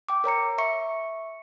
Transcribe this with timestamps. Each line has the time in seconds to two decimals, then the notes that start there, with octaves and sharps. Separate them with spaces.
0.09 G5 D6
0.24 A#4 C#5 A#5 C#7
0.58 E5 C#6 C#7